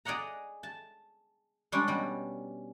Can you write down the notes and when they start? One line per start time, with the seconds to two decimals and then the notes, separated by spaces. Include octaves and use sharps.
0.05 G#4 D5 D#5 F#5 A#5
0.63 A5
1.72 G3 G#3 C#4 D4
1.88 B2 G3